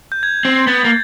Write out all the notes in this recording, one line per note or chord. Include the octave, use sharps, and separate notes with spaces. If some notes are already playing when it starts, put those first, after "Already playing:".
G6
G#6
C4
B3 A6
A#3